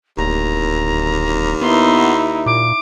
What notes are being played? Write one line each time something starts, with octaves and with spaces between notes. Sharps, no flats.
D1 D#2 A#5
B3 D#4 E4 C6
A#2 D6